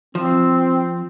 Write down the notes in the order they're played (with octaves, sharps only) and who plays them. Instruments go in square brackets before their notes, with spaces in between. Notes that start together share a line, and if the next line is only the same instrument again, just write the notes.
[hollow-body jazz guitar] F3 [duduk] C4